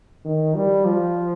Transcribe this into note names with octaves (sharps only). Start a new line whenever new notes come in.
D#3
G3
F3